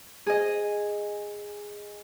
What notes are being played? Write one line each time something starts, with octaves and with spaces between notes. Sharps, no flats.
G#4 D#5